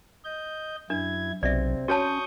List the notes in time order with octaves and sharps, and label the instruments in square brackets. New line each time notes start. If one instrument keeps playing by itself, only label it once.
[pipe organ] D#5 G6
[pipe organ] F#2 E4 G#6 [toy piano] D4
[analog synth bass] B1 [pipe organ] C3 C4 [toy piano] D5 E5
[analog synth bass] C#4 [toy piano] F#4 C#5 A5 [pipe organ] C#6 D#6 G6